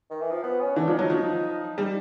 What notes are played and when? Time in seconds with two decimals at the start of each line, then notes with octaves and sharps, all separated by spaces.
0.10 D#3
0.21 E3
0.31 F3
0.43 B3
0.60 C#4
0.76 E3 D4
0.88 F3
0.93 D#4
0.99 F#3
1.10 F3
1.78 G3